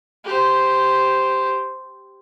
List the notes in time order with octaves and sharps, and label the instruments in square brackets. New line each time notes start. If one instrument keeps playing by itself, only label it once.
[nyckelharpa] G4 C5